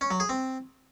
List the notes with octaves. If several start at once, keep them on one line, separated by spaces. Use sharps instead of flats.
C#4
F#3
G#4
C4